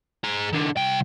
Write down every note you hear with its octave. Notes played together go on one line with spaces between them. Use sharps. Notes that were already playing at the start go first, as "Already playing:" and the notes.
G#4 A#5
D#3 D4
C2 G5